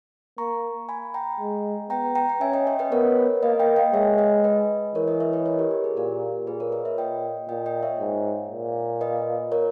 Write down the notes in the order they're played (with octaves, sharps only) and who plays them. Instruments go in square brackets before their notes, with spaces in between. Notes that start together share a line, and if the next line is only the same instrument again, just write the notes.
[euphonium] A#3 [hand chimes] A#5 C#6
[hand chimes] G#5 B5
G5 A#5
[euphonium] G#3
[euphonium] B3 [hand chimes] G5 A#5
[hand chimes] G5 A#5
G5
[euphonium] C#4 [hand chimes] E5 G#5
[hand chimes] D#5 G5
C#5 E5
B4 D#5
[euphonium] B3 [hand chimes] A#4 C#5
[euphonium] A#3 [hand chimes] B4 D#5
[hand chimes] D#5 G5
D#5 G5
[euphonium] G#3 [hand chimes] C#5 E5
[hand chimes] B4 D#5
B4 D#5
[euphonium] E3 [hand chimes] A#4 C#5
[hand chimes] B4 D#5
C#5 E5
B4 D#5
A#4 C#5
G4 A#4
G4
G#4
[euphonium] A#2 [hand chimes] G4 A#4
[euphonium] A#2 [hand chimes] G#4 B4
[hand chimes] A#4 C#5
B4 D#5
C#5 E5
[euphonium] A#2 [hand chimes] D#5 G5
[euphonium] A#2 [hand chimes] D#5 G5
[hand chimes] D#5 G5
C#5 E5
[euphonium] G#2
A#2
[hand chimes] B4 D#5
A#4 C#5